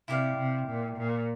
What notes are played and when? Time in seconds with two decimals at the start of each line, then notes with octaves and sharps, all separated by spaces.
0.08 C3 E4 G4 D5 F5
0.38 C3
0.67 A#2
0.97 A#2